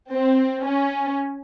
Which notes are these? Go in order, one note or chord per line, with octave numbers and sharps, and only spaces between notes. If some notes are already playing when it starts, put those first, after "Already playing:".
C4
C#4